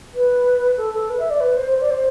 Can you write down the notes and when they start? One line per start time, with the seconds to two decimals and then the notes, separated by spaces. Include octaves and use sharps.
0.15 B4
0.77 A4
0.94 A4
1.10 B4
1.19 E5
1.30 D5
1.40 B4
1.56 C5
1.71 C5
1.81 D5
1.90 C5